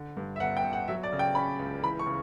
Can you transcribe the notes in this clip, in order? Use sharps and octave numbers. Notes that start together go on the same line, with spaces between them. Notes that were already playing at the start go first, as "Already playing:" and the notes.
Already playing: D3
G2
E5
G1 F#5
G5
G1
F#5
F#3 E5
D5
C#3
G5
C#4 B5
C#2
E3 B5
C#6
C#3